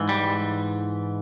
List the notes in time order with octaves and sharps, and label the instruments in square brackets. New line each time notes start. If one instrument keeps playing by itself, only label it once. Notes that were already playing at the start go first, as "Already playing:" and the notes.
Already playing: [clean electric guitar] G#2 E3
G3